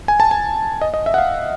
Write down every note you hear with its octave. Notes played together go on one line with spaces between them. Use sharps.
G#5
A5
G#5
D#5
D#5
E5
F#5
F5